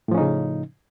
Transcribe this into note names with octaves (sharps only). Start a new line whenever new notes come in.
A2 C#3 F3 C#4 D#4